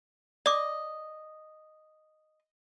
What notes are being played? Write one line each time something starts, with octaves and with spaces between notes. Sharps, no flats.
D5 D#5 D6